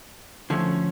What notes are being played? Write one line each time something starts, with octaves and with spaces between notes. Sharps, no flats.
D3 F3 A3 C#4